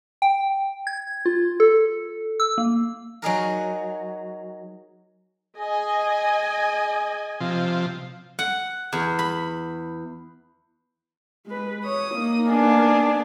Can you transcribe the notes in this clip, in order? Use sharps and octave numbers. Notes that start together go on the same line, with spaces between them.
G5
G#6
F4
A4
E6
A#3
F#3 D#4 G#4 A#4
G#4 D#5 G#5
C3 F3
F#5
E2
B5
G#3 B4
C#5 D#6
A#3 D#4
B3 D4 G#4